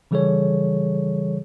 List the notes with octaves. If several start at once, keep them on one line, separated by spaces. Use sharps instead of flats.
C#3 E3 G3 G#4 A4 C#5